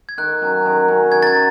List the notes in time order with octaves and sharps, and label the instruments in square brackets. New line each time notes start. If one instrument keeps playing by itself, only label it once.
[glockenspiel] G#6
[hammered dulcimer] D#3 [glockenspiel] F#6
[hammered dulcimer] F#3 C#4
D#3
F#3 C#4
[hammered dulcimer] D#3 [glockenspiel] G#6
[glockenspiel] A6
G#6
[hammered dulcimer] F#3